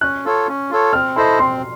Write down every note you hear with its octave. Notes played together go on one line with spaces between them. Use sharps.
C#4 F#6
F4 A4 C#5
C#4
F4 A4 C#5
C4 F6
E4 A4 C5 D#5 C6
C4 C6